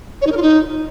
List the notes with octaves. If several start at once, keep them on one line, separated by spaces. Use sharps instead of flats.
C#5
D#4
A#4
F4
D#4